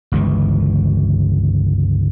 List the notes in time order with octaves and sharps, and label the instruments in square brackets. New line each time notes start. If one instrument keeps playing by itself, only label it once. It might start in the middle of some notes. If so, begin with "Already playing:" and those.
[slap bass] G1 C#2 E3